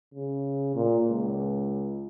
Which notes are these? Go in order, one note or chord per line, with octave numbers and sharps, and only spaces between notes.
C#3
A#2
C#2